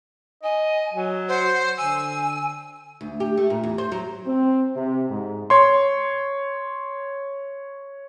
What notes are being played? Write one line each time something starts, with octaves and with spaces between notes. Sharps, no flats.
D#5 G#5
F#3
C5 F#5
D3 G#5 E6
D2
G4
A3
A#2
E2
C5
F#3
C4
C3
G#2
C#5 C6